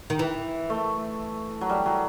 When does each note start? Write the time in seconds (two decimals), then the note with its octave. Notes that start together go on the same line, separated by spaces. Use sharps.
0.10 D#3
0.19 E3
0.70 A3
1.61 F#3
1.70 G3
1.86 F#3